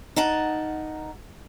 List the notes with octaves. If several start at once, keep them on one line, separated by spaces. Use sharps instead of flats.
D#4 A#4 F#5 A5